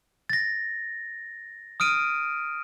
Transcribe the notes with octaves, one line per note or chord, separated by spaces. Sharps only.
A6 A#6
D#6 F6 D7 D#7